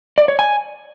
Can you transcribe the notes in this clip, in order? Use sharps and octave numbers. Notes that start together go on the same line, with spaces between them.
D5
C#5
G#5